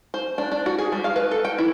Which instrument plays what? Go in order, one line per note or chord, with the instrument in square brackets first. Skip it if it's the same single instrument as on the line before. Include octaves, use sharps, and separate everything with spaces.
[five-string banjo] C5
D4
D4
F#4
G#4
G3
F5
B4
A4
G5
E4